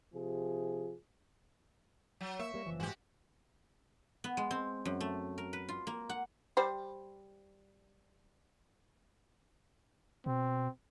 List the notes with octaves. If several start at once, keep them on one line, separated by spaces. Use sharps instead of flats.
C3 F3 G#4
F#3
A#3 E5 C#6
G3 A#3
F#1 C2 E3 F3
G#2 F#4 G4
B3
G#3
C4
F#2
A3
A#4
B4
F4
A#3
F#5
G3 C5
B2 C4